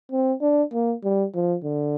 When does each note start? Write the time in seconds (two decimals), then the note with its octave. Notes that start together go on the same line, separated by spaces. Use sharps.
0.11 C4
0.41 D4
0.73 A#3
1.04 G3
1.34 F3
1.64 D3